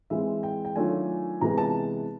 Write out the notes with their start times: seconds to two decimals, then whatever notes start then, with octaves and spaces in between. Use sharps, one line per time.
0.10 E3 G#3 C4 E5
0.43 G5
0.65 G5
0.76 D#3 F#3 A3 D4 F4 G#5
1.41 C3 E3 G#3 B3 A#5
1.58 A5